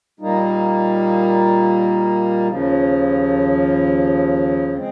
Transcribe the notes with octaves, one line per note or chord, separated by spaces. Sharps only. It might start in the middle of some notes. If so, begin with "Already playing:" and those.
A#2 G3 A#3 D#4
D#2 C#3 F3
G#3 C4